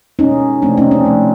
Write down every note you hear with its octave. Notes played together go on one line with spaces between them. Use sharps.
B2 G#3 C#4 D#4
C3 F3 A3 C4 D4
C#4 D#4
C4 D4
C3 F3 A3